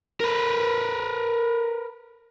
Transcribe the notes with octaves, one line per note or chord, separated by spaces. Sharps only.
A#4 B4